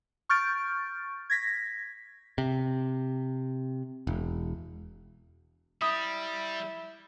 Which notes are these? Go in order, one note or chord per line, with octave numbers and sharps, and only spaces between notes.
C#6 F6 G6 A6 D7
G#6 A#6 B6
C3
E1
G3 E4 D#6